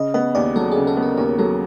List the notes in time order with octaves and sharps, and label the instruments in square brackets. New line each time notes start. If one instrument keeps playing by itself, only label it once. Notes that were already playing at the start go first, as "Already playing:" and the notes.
Already playing: [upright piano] C#3 [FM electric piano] D#5
[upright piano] B3 [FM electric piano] D#5
[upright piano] D#2 [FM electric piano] D5
[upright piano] F#3 [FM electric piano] A4
[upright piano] C#3 [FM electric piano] G#4
[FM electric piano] A4
[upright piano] B3
[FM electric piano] A#4
[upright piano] D#2 [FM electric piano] A#4
[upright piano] F#3 [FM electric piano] A4